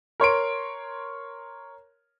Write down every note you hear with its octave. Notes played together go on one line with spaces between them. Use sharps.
A#4 C#5 C6 D7